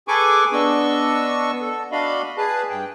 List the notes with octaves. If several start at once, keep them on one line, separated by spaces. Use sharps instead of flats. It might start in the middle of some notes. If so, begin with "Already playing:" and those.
G#4 A4 B4 G#5 C#6 D6
B3 D4 D#5 C#6 E6
A4
D4 F#4 D#5 F5 B5
G#4 B4 A5
G2 G5